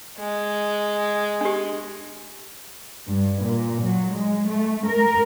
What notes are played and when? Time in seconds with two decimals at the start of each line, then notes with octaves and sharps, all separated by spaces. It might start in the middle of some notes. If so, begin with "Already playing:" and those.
0.18 G#3
1.41 D4 G4
3.07 G2
3.43 A#2
3.82 F#3
4.13 G#3
4.47 A3
4.88 A#4